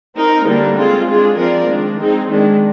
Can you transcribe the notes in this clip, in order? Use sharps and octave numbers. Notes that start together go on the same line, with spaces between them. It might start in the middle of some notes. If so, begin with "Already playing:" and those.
C4 D#4 A#4
D3 G3 A#3 D4
G#3 C4 F4 G#4
G#3 D4 F4 G#4
F3 C4 F4 A#4 D5
D#3 G#3 D4
G#3 C4 D#4 G#4
D#3 G#3 D4